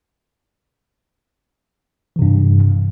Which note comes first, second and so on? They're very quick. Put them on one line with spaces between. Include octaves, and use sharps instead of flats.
E3 C3 G2